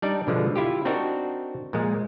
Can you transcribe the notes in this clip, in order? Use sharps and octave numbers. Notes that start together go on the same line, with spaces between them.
G3 D4 D#4 D5
B2 D3 F3 G#3
E4 F4 G4
C4 D4 D#4 F#4 A#4
A#2 F3 G#3